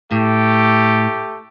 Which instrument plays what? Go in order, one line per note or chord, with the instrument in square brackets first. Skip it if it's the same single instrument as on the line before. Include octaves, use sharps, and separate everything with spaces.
[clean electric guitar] A2 [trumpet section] A3 G4